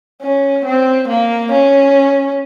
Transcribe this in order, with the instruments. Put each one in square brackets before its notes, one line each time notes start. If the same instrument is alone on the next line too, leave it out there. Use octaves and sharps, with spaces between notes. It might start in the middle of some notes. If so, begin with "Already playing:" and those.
[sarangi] C#4
C4
A#3
C#4